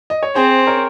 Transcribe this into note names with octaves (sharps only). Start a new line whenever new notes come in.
D#5
C#5
C4 G#4 C5
A#4 C#5